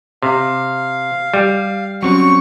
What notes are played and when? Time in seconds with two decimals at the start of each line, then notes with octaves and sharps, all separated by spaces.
0.23 C3 F5
1.34 G3
2.03 F#3 C4 C#4 C#6